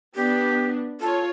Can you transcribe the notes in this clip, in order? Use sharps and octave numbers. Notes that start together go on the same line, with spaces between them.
B3 D4 G4
F4 A4 C#5